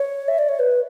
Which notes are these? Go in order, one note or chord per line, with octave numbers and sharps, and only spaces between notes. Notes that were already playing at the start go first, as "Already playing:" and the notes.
Already playing: C#5
E5
D5
C#5
B4